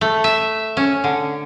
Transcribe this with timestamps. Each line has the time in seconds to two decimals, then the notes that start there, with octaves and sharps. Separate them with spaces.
0.01 A3
0.24 E5
0.77 C#4
1.04 D3